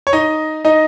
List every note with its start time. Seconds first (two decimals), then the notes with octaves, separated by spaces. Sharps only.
0.07 C#5
0.13 D#4 D#5
0.65 D#4 D#5